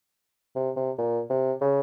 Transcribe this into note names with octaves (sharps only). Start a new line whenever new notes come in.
C3
C3
A#2
C3
C#3